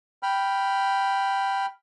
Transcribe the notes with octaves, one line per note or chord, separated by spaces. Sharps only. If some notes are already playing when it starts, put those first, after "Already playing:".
G5 B5 F6